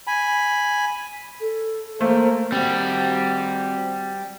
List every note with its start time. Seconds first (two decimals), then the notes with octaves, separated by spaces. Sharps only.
0.07 G#5 B5
1.40 A4
2.01 A3 A#3 C5
2.52 G3 C4 F#4